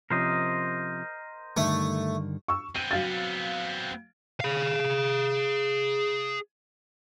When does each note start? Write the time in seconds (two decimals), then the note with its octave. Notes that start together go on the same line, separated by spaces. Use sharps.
0.10 C3 F3 C#4 A#4 C5 D#5
1.57 G2 D3 D#3 A3
2.48 C#6 E6
2.76 B3 C4 D#7
2.91 F#3 F5 A6
4.41 G#4 F5